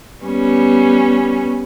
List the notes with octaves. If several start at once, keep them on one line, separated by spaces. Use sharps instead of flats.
G3 B3 C#4